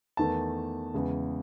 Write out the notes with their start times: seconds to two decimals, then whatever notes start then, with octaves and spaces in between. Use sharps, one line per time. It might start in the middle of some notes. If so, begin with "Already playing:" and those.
0.17 E2 D#3 A3 A5
0.94 E2 C#3 G#3